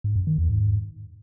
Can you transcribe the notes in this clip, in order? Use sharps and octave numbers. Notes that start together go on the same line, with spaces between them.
G#2
F#2
D#3
E2
G#2